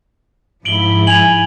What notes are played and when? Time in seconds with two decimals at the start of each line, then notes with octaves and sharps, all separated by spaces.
0.65 G#2 F3 E4 D7 F#7 G7
1.07 G#5 F7 F#7